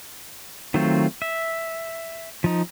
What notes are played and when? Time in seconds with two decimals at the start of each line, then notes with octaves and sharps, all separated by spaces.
0.74 D#3 F#3 A3 C4 F4
1.22 E5
2.44 F3 D#4